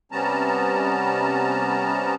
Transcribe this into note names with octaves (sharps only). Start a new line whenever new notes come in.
C3 G3 B3 C#4 A5 A#5